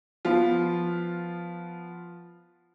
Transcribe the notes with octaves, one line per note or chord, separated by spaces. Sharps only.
F3 B3 F4